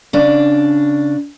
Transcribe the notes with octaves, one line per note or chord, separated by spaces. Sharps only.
C#3 D4